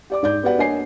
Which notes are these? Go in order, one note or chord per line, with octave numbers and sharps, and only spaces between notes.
G4 D5 D6
G#2 D5 G6
B3 F#4 G4 B4 D5 F#5
A#3 D4 C#5 D#5 G#5 C7